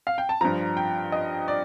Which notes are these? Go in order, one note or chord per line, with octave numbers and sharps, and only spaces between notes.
F5
G5
A5
G2 F3 A#5
G5
D#5
D5